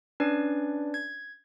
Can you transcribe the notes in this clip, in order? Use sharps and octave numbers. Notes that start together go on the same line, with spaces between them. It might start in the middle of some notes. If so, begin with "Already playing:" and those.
C#4 D4 B4 D5
G#6